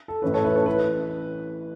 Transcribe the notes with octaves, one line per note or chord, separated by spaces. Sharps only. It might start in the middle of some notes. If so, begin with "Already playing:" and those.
A4
A1 A2 E3 C#4 E4 B4
A4 C#5
B4 E5
A4 C#5
E3 C#4 B4